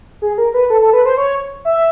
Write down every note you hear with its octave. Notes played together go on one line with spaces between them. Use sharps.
G#4
A#4
B4
A4
A4
B4
C5
C#5
E5